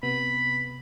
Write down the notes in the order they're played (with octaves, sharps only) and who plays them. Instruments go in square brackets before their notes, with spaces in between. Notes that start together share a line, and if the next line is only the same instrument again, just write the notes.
[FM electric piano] C3 B3 [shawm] B5